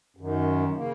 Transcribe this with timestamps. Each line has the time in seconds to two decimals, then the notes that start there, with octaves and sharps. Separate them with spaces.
0.17 F#2 D#3
0.76 C#3 A#3